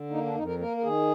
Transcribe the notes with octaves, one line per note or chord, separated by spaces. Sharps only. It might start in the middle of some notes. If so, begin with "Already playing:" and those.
Already playing: D3
A#3 D#4
D4
F2 D#4
A#4
A#3 A#4
A#4
D#3 G#4